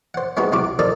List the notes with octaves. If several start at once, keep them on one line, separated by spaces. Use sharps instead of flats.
C5 F#5
G#3 B3 C4 D#4 F#4
C2 F4 F#4 D6
D#4 F4 A4 A#4 C5 D5